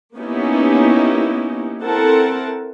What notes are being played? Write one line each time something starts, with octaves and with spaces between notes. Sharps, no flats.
A#3 B3 C#4 D#4 E4 G4
C4 E4 A4 A#4 F#5 A5